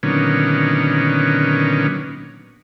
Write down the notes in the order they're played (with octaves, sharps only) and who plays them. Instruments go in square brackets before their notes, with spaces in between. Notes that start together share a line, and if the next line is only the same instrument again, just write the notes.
[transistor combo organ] A#2 D3 D#3 F#3 B3 C#4